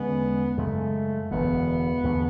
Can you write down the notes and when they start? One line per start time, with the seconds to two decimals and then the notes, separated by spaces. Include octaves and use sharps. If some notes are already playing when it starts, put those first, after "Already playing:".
Already playing: E2 D3 G#3 B3 C#4
0.57 F#2 C#3 G#3 A3
1.31 E1 E2 D3 B3
2.04 E2 D3 A3